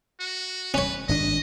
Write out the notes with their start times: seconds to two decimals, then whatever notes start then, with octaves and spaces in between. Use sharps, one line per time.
0.20 F#4
0.74 C#4 B4 C#5
1.09 G#1 G2 D4 D#5